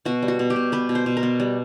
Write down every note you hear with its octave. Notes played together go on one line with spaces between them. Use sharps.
B2 F#4
G3
F#4
B2
G4
B2
B3 B4
B2
C5
B2
A#4
B3
G3